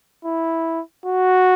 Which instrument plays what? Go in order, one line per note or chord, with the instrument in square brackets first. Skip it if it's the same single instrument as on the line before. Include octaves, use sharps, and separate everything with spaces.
[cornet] E4
F#4